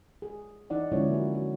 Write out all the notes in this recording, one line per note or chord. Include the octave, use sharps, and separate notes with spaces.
G#4
E3 D#4 D5 F#5
D3 F3 G#3 C#4 E4 C#5
A#3 F#4
F#4